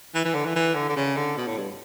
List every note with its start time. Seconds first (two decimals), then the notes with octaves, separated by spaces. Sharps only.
0.15 E3
0.25 E3
0.35 D3
0.46 E3
0.56 E3
0.75 D3
0.89 D3
0.96 C#3
1.17 D3
1.37 B2
1.47 A2
1.58 G2